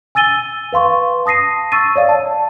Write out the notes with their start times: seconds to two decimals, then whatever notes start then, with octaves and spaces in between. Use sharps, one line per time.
0.15 G#5 E6 A6 D#7 G7
0.73 B4 F5 C6 C#6
1.26 A5 D#6 A#6 C7 D#7
1.72 C#6 E6 A6 D#7
1.96 C#5 D5 F5
2.09 A5